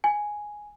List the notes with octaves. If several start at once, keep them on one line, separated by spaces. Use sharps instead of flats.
G#5